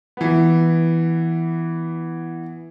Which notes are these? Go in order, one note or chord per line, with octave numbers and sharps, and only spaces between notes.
E3 B3